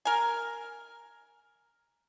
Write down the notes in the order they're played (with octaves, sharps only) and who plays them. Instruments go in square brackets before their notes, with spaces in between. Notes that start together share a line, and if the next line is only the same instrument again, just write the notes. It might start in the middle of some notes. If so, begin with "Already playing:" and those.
[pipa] A#4 G#5